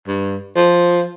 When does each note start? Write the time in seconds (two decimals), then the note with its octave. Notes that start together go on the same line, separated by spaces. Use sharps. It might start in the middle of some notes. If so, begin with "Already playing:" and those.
0.08 G2
0.56 F3